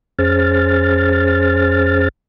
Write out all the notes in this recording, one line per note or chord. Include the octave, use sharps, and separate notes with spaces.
F2 C#4 G#4 C5 F6 A6